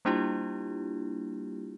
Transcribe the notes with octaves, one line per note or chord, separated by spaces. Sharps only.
G3 A#3 D4 E4 F4 G4